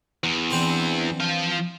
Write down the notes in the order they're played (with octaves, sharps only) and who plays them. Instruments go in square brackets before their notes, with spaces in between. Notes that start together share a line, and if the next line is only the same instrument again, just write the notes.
[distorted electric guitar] E2
[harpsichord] E3 C4 D4
[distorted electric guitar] F3 F5